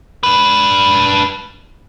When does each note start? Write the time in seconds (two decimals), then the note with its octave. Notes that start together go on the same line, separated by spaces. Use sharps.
0.23 D4 B4